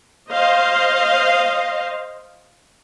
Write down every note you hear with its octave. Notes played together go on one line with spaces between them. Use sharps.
C5 D#5 F5